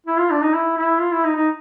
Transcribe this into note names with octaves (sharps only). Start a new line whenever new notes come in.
E4
F4
D4
D#4
E4
E4
F4
E4
D#4
D#4